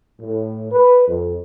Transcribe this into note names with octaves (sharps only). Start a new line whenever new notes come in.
A2
B4
F2